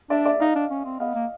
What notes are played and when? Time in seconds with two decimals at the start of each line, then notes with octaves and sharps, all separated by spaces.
0.10 D4 D5 E5
0.25 D5 E5
0.40 D#4 D#5 F5
0.55 D4
0.70 C#4
0.85 C4
1.00 B3 D#5 F5
1.15 A#3